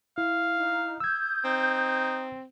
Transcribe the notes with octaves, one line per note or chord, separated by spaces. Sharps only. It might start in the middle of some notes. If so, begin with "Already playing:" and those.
E4 F5
D#4
D#6 E6 G6 G#6
C4 D#4